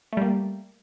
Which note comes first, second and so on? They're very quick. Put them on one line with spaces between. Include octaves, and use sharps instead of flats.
A3 G3 A#3